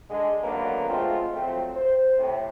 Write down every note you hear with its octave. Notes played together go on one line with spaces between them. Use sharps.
D3 G#3
G#1 D3 F#3 A#3 B3 B4
G#3 A3 B3 C4 F4
F3 F#3 A3 C4
C5
A2 C3